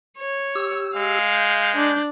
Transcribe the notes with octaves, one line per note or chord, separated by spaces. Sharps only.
C#5
G4 E6
G#3 F5
G6
D4